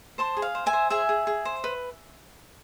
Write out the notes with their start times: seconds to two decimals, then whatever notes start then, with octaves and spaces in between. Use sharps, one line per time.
0.18 C5 A5 C6
0.37 G#4
0.42 F5
0.55 C5
0.66 E5 G#5
0.73 C5
0.90 G#4 E5 G#5
1.09 G#4
1.27 G#4
1.45 C5
1.64 B4